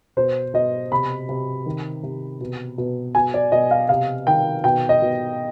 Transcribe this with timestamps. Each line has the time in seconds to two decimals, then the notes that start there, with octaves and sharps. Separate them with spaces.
0.17 B2 C5
0.54 B2 D#5
0.92 C3 B5
1.29 C3
1.66 D#3
2.03 C3
2.41 B2
2.78 B2
3.15 B2 G#5
3.34 D5
3.52 B2 D#5
3.71 F5
3.89 C3 F5
4.27 D#3 G5
4.64 B2 G5
4.89 D#5
5.02 B2